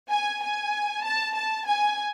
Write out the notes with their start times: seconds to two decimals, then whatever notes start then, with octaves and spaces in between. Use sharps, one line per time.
0.10 G#5
0.42 G#5
1.04 A5
1.35 A5
1.67 G#5